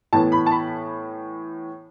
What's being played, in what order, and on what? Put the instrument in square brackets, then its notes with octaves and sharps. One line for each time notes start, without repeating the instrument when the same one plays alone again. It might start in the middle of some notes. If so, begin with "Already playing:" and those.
[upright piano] A2 E3 B3 A5
B5
A5
B5